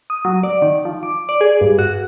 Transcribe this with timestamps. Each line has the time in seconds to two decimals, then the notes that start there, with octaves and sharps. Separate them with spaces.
0.10 D#6
0.25 F#3
0.43 D5
0.62 D#3
0.85 F3
1.03 D6
1.29 D5
1.41 G#4
1.61 G2
1.79 F#4